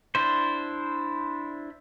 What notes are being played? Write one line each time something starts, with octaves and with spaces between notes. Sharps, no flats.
D4 E4 C5